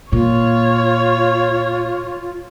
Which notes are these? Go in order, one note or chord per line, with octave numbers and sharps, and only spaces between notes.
A#2 F4 C#5